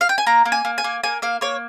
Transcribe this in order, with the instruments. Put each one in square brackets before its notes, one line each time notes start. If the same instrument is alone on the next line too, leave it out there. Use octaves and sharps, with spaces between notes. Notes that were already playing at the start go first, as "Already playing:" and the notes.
[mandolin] F5
G5
G#5
A#3 A#5
A#3
G#5
A#3
G#5
A#3
A#3 G#5
A#3 F5
A#3 C#5